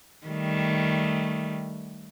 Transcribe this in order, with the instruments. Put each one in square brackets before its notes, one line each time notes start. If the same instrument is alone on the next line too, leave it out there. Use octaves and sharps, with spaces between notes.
[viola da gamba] D#3 G3 A3